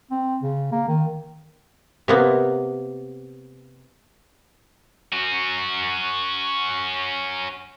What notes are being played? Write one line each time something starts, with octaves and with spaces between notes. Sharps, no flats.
C4
C#3
A#3
D#3
C3 A#3 B3
C#4 F#4